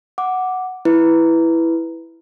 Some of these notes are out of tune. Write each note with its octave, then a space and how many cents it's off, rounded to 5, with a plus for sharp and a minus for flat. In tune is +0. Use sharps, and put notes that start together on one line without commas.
F#5 +0 D6 +0
E4 +0 B4 +0